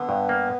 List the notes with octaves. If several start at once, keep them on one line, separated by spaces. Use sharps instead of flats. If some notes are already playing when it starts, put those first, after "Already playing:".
Already playing: D3 B3
G2
A#3